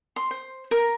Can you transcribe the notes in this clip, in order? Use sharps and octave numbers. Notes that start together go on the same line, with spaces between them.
C6
C5
A#4